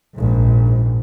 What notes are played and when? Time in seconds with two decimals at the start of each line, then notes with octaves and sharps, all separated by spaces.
0.15 A#1 G#2